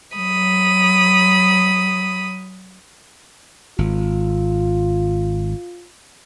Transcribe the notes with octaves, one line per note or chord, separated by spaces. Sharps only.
F#3 B5 D#6
G#1 F4